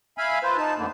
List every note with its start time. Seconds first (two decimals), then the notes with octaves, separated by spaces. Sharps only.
0.18 E5 F5 G#5 B5
0.43 F4 B4 C5
0.57 D#4 A5
0.78 F2 A2 D3 A#3